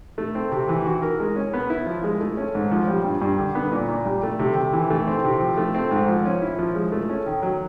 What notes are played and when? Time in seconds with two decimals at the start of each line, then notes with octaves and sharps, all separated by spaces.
0.18 A3
0.35 C4
0.52 C3
0.69 E3
0.85 F#4
1.02 A#4
1.20 G#3
1.36 C#4
1.54 B3
1.70 E4
1.86 F3
2.04 G#3
2.21 A3
2.37 C#4
2.55 G#2
2.71 F3
2.88 G3
3.05 G2
3.22 G2
3.39 D3
3.55 B3
3.72 A#2
3.89 A#2
4.05 G3
4.23 A3
4.39 C3
4.56 C3
4.73 E3
4.90 A3
5.07 C4
5.24 C3
5.41 F3
5.57 A3
5.75 C4
5.91 G#2
6.08 F3
6.26 C#4
6.42 E4
6.59 F3
6.75 G#3
6.92 A3
7.09 C#4
7.26 D#3
7.42 F#3